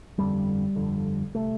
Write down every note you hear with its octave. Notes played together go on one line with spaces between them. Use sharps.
G1 F2 D3 G3
G1 F2 D3
C3 A3